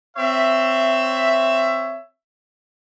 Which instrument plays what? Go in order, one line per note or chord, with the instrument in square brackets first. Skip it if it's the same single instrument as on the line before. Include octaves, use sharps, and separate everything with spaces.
[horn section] C4 C#5 E5